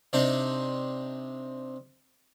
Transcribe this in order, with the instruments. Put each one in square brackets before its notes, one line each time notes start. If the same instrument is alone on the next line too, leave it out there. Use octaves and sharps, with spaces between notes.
[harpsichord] C3 C4 D4 D#4